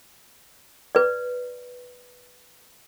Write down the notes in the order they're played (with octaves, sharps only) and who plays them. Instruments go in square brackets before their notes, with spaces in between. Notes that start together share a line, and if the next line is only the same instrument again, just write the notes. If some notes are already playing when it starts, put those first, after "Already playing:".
[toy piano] B4 D5